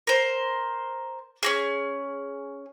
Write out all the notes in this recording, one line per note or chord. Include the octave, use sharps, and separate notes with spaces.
A#4 C5
C#4 F#4 G#4